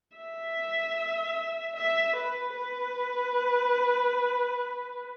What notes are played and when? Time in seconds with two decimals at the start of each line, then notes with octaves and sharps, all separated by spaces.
0.17 E5
1.76 E5
2.16 B4
2.55 B4